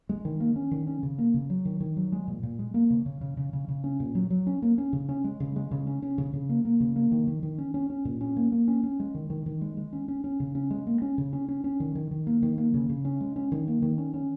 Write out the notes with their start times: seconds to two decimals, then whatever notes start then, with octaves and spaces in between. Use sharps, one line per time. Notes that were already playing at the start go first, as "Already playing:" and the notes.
0.09 G#3
0.25 D#3
0.40 A#3
0.56 C#4
0.71 D#3
0.87 C#4
1.03 C#3
1.18 A#3
1.34 C#3
1.50 F#3
1.65 D#3
1.80 D#3
1.96 F#3
2.12 G#3
2.28 A#2
2.43 A#2
2.59 G#3
2.74 A#3
2.90 C#3
3.06 C#3
3.21 C#3
3.37 C#3
3.53 C#3
3.68 C#3
3.84 C#4
4.00 A#2
4.15 F#3
4.30 F#3
4.47 C#4
4.62 A#3
4.78 C#4
4.93 C#3
5.09 C#4
5.24 G#3
5.40 C#3
5.56 G#3
5.71 C#3
5.87 C#4
6.02 C#4
6.18 C#3
6.33 C#3
6.49 A#3
6.65 A#3
6.80 C#3
6.96 A#3
7.12 D#3
7.27 D#3
7.43 D#3
7.58 C#4
7.74 C#4
7.90 C#4
8.05 A#2
8.21 C#4
8.36 A#3
8.52 A#3
8.68 C#4
8.83 C#4
9.00 G#3
9.15 D#3
9.30 D#3
9.46 D#3
9.61 G#3
9.77 G#3
9.93 C#4
10.08 C#4
10.24 C#4
10.40 C#3
10.55 C#4
10.70 G#3
10.87 A#3
11.02 C#4
11.18 C#3
11.33 C#4
11.48 C#4
11.64 C#4
11.80 D#3
11.95 D#3
12.11 D#3
12.27 A#3
12.42 D#3
12.58 A#3
12.74 C#3
12.89 C#3
13.05 C#4
13.21 G#3
13.36 C#4
13.52 D#3
13.68 A#3
13.82 D#3
13.98 C#4
14.14 C#4